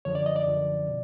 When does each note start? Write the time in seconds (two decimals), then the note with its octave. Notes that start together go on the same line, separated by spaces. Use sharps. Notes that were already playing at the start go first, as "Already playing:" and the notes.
0.05 F#2 D3 F3 C#5
0.15 D5
0.26 D#5
0.36 D5
0.45 F#2 D3 F3
0.88 B2